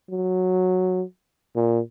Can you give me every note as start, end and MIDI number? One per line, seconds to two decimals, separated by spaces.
0.10 1.03 54
1.56 1.80 46